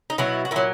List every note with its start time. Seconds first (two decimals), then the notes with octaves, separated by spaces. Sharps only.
0.10 D#4
0.18 B2 F#3 E4
0.45 F#4
0.51 A#2 F#3 E4